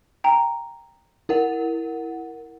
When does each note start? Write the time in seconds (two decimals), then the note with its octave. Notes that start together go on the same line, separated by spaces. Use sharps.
0.24 G5 A#5
1.29 E4 A#4 F#5